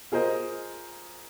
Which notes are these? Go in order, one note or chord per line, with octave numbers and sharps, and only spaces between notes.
F4 G#4 A#4 C5 D#5